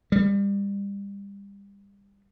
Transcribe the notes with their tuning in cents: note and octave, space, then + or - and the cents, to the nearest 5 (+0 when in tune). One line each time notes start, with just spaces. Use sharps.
G3 +30